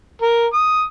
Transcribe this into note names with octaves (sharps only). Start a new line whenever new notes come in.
A#4
D#6